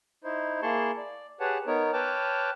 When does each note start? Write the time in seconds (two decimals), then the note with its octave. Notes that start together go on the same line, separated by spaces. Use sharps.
0.24 D#4 E4 C5
0.62 A#3 E4 G#4 A5 C6 C#6
0.97 D5
1.40 G4 G#4 B4 C#5 F#5 A5
1.67 B3 D#4 A#4 C#5
1.93 B4 C#5 G5 A5 D6 F6